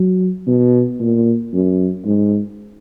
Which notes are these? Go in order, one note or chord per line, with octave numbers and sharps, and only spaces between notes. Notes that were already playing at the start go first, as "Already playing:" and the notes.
Already playing: F#3
B2
A#2
F#2
G#2